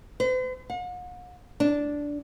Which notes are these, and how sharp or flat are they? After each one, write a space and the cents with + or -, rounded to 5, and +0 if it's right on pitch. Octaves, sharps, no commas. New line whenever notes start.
C5 -45
F#5 -45
D4 -10